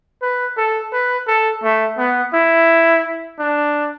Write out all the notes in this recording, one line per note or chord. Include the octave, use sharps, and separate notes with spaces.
B4
A4
B4
A4
A3
B3
E4
D4